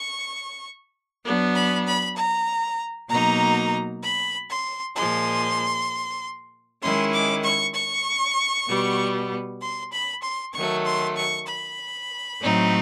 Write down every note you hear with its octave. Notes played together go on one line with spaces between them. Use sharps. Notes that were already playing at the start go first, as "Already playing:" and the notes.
Already playing: C#6
F#3 B3 D4
B5
B5
A#5
B2 F#3 A#3 D#4 A#5
B5
C6
A#2 F3 G#3 C6
D#3 G#3 C#4 E4 C6
D6
C#6
C#6
B2 G3 B3
C6
B5
C6
D#3 F#3 A3 C#6
C6
C#6
B5
A2 F#3 A3 C4 D#4